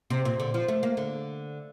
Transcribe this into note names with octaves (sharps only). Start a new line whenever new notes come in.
C3
A#2
D3
F3
A3
A#3
D3